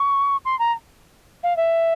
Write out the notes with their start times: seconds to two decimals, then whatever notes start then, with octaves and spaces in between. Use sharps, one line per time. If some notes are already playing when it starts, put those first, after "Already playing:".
Already playing: C#6
0.45 C6
0.59 A#5
1.43 F5
1.56 E5